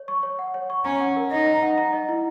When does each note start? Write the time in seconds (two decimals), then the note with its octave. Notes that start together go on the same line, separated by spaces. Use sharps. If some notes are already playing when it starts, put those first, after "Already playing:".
Already playing: C#5
0.08 C#6
0.23 C#5
0.39 F#5
0.54 C#5
0.70 C#6
0.85 C#4 A#5
1.00 F#5
1.16 A#4
1.31 D#4 D#5
1.46 A#5
1.62 F#5
1.78 A#5
1.93 D#5
2.09 E4